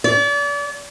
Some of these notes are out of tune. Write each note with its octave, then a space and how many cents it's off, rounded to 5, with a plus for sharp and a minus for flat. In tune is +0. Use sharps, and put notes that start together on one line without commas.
D5 -35